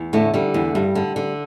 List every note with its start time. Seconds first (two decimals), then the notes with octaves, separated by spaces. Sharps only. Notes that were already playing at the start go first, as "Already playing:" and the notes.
Already playing: E2
0.13 A2 D3 A3
0.34 D3 G3
0.54 E2
0.75 G2 G3
0.95 D3
1.16 D3